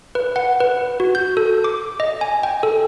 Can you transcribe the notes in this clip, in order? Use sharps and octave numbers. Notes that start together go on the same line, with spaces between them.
B4
F#5
B4
F#4
G6
A4
D6
D#5
G#5
G5
A4